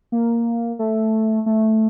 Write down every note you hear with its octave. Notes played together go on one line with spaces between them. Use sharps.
A#3
A3
A3